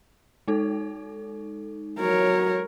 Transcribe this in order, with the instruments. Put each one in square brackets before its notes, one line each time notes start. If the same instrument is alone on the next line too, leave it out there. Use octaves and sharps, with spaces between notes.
[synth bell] G#3 D#4 A4
[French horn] F#3 [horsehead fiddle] A#4 C#5